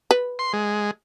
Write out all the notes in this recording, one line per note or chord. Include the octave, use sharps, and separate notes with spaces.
B4
C6
G#3